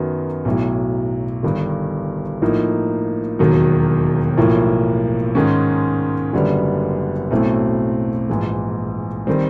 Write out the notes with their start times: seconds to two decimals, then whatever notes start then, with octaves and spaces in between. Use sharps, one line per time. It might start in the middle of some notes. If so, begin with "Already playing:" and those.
Already playing: F#2 D#3 F#3 B3
0.45 B1 A2 F#3
1.43 G1 G2 D#3
2.42 A2 F3 A#3 D#4
3.39 E1 D#2 D#3 F#3
4.37 B1 A2 F3 A#3
5.35 G#2 D#3 G#3 C#4
6.33 F#1 F#2 D3 G3 B3
7.31 B1 A2 F#3 A3 C4
8.30 A#1 G#2 E3
9.27 D#3 G3 C4